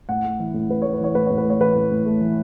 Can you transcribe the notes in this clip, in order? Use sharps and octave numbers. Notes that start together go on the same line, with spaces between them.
A2 F#5
A3
E3
A2
A2 B4
A3 C#5
B4
E3 C#5
A2 B4
A2 C#5
B4
A3
C#5
E3 B4
A2
A2
A3
E3